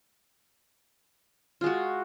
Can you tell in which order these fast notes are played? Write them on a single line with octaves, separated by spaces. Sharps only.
F4 G#3 F#4